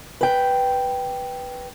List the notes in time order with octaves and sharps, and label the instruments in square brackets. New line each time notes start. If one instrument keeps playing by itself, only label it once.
[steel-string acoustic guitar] B4 G5